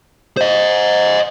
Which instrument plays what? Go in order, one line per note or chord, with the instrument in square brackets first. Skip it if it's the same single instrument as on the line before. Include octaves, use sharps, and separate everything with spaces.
[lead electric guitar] C5 D#5